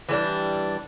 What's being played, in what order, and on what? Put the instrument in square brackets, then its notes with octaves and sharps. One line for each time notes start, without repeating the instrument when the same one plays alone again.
[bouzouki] E3 G3 D4